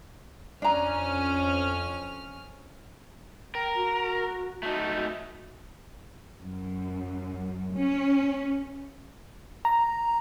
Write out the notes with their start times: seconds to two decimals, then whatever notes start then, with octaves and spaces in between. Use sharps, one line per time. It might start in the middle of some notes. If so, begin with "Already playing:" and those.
0.62 F2 C#4 D4 A#5 F6
3.55 A#4 G5
3.75 F#4
4.63 A3 D#4 F#4
6.39 F#2
7.75 C#4
9.65 A#5